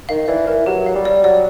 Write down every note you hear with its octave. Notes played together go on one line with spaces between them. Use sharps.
D#3 F5
E3 D5
E3 A#4
F#3 G4
F5
G3
D5
F#3 D5